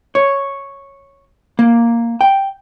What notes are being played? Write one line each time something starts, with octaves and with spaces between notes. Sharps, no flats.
C#5
A#3
G5